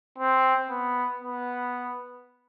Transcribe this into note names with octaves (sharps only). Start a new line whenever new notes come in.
C4
B3
B3